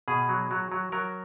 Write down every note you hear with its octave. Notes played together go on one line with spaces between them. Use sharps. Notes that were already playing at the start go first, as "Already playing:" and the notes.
B2 G#4
F#3
F#3
F#3
F#3 A#4